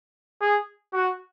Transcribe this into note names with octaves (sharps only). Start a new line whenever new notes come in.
G#4
F#4